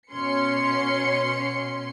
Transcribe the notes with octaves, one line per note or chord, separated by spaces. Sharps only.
B2 C#4 C6 C#7